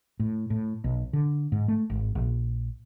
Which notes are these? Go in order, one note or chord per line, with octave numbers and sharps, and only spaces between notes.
A2
A2
B1
D3
G#2
A3
G#1
A#1